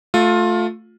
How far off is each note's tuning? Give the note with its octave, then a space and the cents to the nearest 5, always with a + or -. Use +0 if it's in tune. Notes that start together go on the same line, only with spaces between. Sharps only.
A3 +0 F4 +20